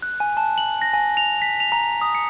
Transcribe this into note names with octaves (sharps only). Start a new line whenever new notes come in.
F#6
G#5
A5
F#7
A#6
G#5
F7
B6
F7
A#5
D#6
C#7